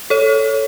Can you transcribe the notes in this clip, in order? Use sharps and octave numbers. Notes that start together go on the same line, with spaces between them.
A4 C#5